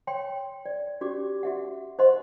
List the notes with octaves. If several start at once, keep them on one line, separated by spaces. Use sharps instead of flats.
C#5 G5 C6
D5
C#4 F#4 G4 D5 D6
F#4 E5 F#5
C5 D#5 F#5 C6